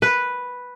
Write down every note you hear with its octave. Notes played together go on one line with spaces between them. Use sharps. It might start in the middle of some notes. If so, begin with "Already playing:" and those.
B4